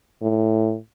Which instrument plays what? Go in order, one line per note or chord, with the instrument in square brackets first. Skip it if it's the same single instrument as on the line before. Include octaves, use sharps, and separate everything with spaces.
[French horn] A2